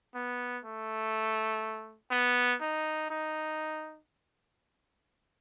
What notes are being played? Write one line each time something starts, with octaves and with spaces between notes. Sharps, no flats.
B3
A3
B3
D#4
D#4